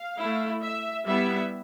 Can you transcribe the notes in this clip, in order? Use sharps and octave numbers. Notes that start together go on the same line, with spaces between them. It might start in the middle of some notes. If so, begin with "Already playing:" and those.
Already playing: F5
A3 E4
E5
G3 B3 E4 E5